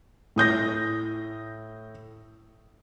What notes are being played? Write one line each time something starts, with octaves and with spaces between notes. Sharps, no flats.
A2 D#6 G6 A#6